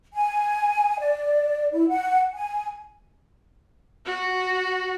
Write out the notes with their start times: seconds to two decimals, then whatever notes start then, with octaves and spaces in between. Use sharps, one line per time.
0.13 G#5
0.99 D5
1.72 E4
1.88 F#5
2.34 G#5
4.05 F#4